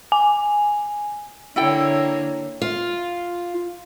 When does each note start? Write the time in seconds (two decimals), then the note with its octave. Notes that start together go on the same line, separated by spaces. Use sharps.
0.12 G#5
1.56 D3 A#3 E4 A4 C#5 G5
2.61 F4